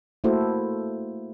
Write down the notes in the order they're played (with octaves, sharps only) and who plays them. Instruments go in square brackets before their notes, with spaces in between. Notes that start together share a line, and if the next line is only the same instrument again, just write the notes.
[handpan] A3 A#3 E4 F#4 A4 C5